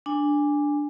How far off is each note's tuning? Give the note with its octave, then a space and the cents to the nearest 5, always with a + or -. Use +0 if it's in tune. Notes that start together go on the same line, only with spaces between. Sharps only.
D4 +0 G#5 -15